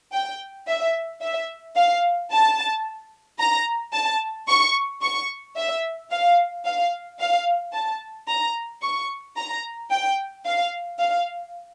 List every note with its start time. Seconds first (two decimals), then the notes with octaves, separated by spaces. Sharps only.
0.13 G5
0.68 E5
1.21 E5
1.76 F5
2.31 A5
3.39 A#5
3.93 A5
4.48 C#6
5.02 C#6
5.56 E5
6.11 F5
6.65 F5
7.20 F5
7.73 A5
8.28 A#5
8.82 C#6
9.37 A#5
9.90 G5
10.45 F5
10.99 F5